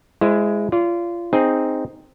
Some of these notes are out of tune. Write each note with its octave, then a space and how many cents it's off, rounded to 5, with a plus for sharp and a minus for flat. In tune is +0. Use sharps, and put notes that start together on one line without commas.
G#3 +0 E4 +25 C5 +0
F4 -20 D5 -40
C4 +0 D#4 +0 G#4 +0